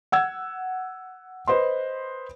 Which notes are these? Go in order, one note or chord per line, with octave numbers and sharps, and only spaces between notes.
F#5 E6 G#6
B4 C5 D#5 C6